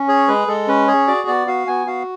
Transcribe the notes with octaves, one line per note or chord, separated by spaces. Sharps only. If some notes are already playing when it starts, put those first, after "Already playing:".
Already playing: C#4
G#4 C#5
G#3 B4
G#3 A4
C#4 B4
G#4 C#5
F#4 D5
B3 D5
F#4 F5
B3 G#5
F#4 F5